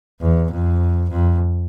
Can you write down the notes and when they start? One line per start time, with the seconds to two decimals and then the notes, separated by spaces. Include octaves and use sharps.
0.22 E2
0.52 F2
1.10 F2